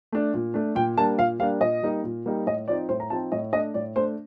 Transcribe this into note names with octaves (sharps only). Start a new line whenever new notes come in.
A3 D4
A#2
A3 D4
A#2 G5
G3 A#3 D4 A5
A#2 F5
G3 A#3 D4 F5
A#2 D#5
G3 A#3 D#4
A#2
G3 A#3 D#4
A2 D#5
F3 C4 D#4 D5
A2 C5
A#5
F3 C4 D#4 A5
A2 D#5
A3 D4 D#5
A2 D5
A3 D4 C5